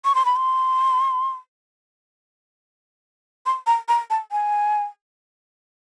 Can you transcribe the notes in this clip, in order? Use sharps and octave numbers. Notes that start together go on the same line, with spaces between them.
C#6
C6
B5
C6
C6
A#5
A#5
A5
G#5